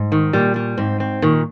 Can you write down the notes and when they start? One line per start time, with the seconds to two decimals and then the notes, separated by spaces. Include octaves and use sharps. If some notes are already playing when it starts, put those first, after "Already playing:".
Already playing: G#2
0.12 D#3
0.33 A#2 G3
0.56 G3
0.78 G#2 C4
1.00 C4
1.22 A#2 D#3